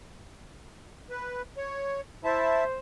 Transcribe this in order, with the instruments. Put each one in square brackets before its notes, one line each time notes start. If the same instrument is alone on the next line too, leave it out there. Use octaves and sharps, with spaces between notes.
[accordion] B4
C#5
[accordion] E4 E5 A5 [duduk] C5